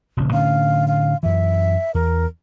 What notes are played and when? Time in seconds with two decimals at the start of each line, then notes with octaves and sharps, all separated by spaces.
0.17 D#1 A#1 C#3
0.33 A2 D3 C#4 F5
0.88 F5
1.23 F#2 E3 E5
1.95 E2 A#4